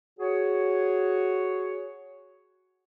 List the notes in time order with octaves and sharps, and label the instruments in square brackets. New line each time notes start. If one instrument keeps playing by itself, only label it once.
[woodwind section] F#4 G#4 C#5